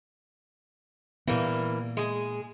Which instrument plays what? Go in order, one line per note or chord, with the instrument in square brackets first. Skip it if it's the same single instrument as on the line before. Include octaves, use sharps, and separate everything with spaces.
[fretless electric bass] A#2 B3 [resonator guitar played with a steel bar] E3 G3 A#3
[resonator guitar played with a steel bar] G#3 G#4